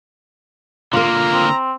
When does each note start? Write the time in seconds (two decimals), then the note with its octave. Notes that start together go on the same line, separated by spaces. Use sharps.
0.93 D3 A#3 F4 A#4 A#5
1.33 C4